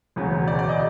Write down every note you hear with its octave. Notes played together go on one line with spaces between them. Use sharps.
E1 D2 C#3 F#3
D5
D5
D#5